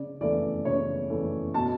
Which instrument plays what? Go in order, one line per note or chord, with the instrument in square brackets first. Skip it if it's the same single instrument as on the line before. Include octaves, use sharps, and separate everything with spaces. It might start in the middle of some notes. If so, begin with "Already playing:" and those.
Already playing: [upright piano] C#3 D5
E3 A3 D5
C#3 C#5
E3 A3
B2 A5